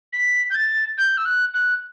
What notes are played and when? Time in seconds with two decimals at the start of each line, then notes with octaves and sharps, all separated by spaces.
0.13 B6
0.50 G6
0.55 A6
0.98 G6
1.17 E6
1.25 F#6
1.54 F#6